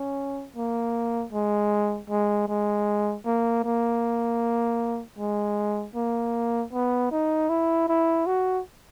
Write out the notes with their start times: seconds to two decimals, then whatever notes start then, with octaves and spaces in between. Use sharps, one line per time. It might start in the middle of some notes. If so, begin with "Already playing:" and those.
Already playing: C#4
0.56 A#3
1.32 G#3
2.10 G#3
2.48 G#3
3.26 A#3
3.64 A#3
5.18 G#3
5.95 A#3
6.73 B3
7.11 D#4
7.49 E4
7.88 E4
8.26 F#4